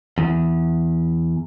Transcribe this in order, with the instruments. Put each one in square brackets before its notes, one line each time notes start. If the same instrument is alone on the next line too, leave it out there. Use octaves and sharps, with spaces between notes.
[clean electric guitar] E2